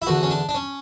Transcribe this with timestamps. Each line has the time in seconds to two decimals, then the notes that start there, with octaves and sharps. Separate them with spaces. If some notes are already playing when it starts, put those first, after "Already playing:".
0.02 E4
0.06 E2 D3 F#4
0.23 C#4
0.30 D4
0.49 D4
0.54 C#4